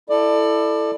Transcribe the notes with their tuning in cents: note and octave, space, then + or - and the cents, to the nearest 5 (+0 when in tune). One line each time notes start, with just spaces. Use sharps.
E4 +5 A4 +0 D5 +25